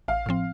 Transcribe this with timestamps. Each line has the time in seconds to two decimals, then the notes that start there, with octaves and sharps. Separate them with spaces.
0.08 A1 F5
0.26 A2 F3 C4